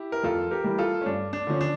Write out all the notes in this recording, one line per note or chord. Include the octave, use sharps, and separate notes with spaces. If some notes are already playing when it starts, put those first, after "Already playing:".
Already playing: E4 G4
A#4
F2 F4 A4
G4 A#4
E3 G3
F4 A4
C#4
G2 D4
D4
D3 F3 C#4
D4